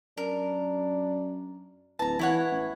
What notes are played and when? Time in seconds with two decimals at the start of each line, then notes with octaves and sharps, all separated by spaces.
0.17 F#2 D4 A#4
1.99 D1 E3 A5 A#5
2.19 B2 E3 E4 C#5 F#5
2.52 A1